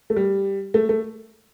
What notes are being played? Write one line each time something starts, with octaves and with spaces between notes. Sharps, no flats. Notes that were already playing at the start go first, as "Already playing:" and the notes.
A3
G3
A3
A3